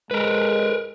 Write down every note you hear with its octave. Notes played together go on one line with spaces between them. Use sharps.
G#3 A#4 B4